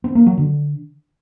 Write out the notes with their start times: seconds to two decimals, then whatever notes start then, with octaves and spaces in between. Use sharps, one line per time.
0.04 C4
0.15 A#3
0.26 F#3
0.38 D3